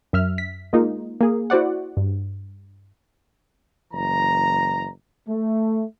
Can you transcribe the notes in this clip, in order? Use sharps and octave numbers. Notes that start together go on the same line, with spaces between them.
F#2 E5 F6
B6
G#3 A#3 D#4 F4
A#3 G#4
E4 F#4 C5 D5 F#5
G2
F#1 E3 A#5
A3